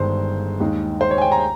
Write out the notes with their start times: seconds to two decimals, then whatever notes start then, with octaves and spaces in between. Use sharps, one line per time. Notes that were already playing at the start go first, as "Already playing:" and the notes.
Already playing: G1 G2 D#3 G#3 C5
0.60 D#2 D#3 G#3 D#4
1.01 C5
1.11 C#5
1.18 G#5
1.22 G5
1.32 A#5